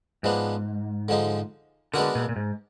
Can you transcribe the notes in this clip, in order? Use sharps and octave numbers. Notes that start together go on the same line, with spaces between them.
G#2 F3 G#3 B3 D4
D3 F3 G#3 D#4
D3 G#3 B3 D4 F#4 A#4
A#2
A#2
G#2